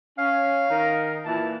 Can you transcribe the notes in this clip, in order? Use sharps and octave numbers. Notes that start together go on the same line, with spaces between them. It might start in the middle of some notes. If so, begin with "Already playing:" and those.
C#4 F5
D#3 D#4 A#4
A#2 E3 A5